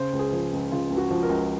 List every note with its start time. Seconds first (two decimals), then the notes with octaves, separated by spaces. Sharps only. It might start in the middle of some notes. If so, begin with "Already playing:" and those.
Already playing: C#3 C5
0.13 C#2
0.19 G#4
0.33 F3
0.53 C#2
0.72 C#3 F4
0.90 C#2
0.97 F#4
1.11 F3
1.23 A#4
1.29 C#2